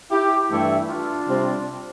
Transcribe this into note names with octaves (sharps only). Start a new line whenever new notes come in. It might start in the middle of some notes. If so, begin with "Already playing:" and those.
E4 G4
G2 E3 A3 E4 G4
D4 F4
C3 G3 C4